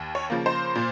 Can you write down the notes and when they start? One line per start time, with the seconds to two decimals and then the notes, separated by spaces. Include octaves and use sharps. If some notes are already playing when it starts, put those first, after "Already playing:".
Already playing: D#2
0.15 C#5
0.30 C#3 F3 A#3
0.46 C5
0.75 A#2